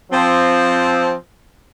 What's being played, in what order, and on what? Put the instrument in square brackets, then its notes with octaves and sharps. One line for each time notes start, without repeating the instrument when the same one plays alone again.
[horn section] F3 C4